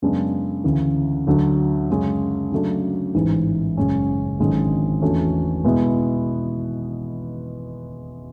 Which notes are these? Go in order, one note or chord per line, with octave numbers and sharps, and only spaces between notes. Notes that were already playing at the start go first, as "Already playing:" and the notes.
F#2 C#3 G#3 B3 D4
D2 C#3 E3
D2 D3 F#3
F#2 C#3 G#3 C#4
C#3 F#3 A3 D4
A1 G#2 E3 G#3
F#1 F#2 C#3 G#3 C#4
G#1 F#2 D3 G#3 C#4
E2 D3 A3 C#4 F#4
B2 G#3 B3 E4